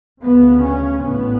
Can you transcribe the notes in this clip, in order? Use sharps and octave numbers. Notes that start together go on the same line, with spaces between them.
D2 C#3 B3
C#4
A1 A2 B3